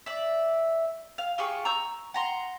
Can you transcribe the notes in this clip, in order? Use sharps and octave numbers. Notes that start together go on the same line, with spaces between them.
D5 E5
F5
F4 G4 G#4 C#6
A#5 C#6 E6 G6
F#5 A#5 C6